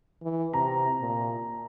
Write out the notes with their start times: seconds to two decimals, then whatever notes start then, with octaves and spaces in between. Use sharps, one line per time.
0.22 E3
0.54 C3 A#5
1.00 A#2